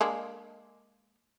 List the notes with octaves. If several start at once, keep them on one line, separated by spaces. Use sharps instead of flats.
G#3 A#3 D4